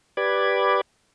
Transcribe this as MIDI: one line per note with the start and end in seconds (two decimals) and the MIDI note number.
0.17 0.81 67
0.17 0.81 71
0.17 0.81 74
0.17 0.81 83
0.17 0.81 86
0.17 0.81 92